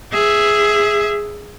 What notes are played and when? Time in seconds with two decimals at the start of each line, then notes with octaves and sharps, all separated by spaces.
0.13 G#4 E5